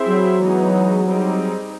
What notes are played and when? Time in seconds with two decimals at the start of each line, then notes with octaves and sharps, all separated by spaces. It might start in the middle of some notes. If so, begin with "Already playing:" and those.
Already playing: C4 E4 G#4 C5 E5
0.08 F#3
0.41 E3 G#3 B3 D#4 G#4
1.06 G3 C4 D#4 G#4